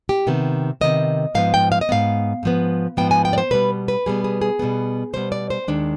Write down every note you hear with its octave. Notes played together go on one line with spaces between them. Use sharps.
G4
C3 D#3 B3
C3 D#3 B3 D#5
G#2 F3 B3 F5
G5
F5
D#5
G#2 F3 B3 F5
G#2 F3 B3
G#2 F3 B3 G5
G#5
G5
D5
C5
B2 G3 B3 B4
B4
B2 G3 B3 G#4
G#4
G#4
B2 G3 B3
B2 G3 B3 C5
D5
C5
D#2 D#3 G#3 D4